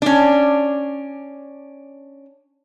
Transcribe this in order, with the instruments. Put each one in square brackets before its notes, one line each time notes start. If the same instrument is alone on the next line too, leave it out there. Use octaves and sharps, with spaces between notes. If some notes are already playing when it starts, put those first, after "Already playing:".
[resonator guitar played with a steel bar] C#4 D4